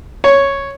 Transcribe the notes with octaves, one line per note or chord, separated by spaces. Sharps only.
C#5